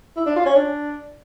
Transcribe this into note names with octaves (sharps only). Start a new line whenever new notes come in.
E4
D4
F4
C#4
D4